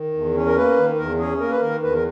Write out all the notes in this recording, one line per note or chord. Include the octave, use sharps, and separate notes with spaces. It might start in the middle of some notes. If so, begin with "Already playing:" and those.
Already playing: D#3
E2
C#4
A#4
A#3 B4
D#3
E2 A#4
C#4 G#4
A#3 A#4
B4
D#3 A#4
E2 B4
A#4